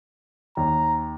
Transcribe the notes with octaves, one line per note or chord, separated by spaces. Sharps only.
D#2 A#5